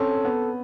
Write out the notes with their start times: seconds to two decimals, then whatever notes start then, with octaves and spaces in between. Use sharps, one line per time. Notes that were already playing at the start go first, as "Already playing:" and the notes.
Already playing: C4 C#4 A4
0.25 B3